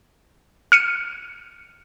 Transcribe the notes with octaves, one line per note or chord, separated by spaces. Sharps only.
F6 C#7 D#7